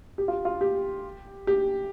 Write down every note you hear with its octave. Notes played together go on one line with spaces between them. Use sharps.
G4
F4
F4
G4
G4